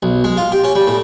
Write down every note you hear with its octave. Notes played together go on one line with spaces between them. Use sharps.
B1
G#3
F4
G4
C#4
G3
A2